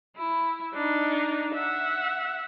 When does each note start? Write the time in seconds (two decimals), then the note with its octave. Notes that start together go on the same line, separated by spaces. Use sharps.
0.17 E4
0.73 D4 D#4
1.55 E5 F#5